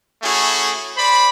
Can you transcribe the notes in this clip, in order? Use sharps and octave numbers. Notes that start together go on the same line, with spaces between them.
A3 C#4 E4 F#4 G#4
C5 D5 B5